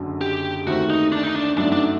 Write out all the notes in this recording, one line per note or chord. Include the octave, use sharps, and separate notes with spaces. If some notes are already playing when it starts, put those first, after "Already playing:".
Already playing: F#1 F#2 D3 F#3
G4
D#2 D#3 A3 C4 F#4 G4
D#4
D4
D#4
D4
G1 F#2 F#3 A3 D4 D#4
D4